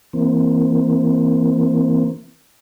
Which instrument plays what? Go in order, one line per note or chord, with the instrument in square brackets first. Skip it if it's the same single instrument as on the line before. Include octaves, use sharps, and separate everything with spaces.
[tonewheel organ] E3 A#3 C4